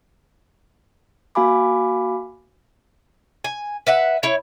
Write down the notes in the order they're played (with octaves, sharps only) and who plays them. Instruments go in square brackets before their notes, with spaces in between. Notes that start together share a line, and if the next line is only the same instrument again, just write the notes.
[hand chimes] A#3 F#4 F5 G#5 B5 D6
[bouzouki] G#5
B4 E5 F#5
E4 C#5